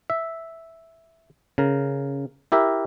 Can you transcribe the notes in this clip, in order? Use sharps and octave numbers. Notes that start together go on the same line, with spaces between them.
E5
C#3 A#4
E4 G4 A#4 E5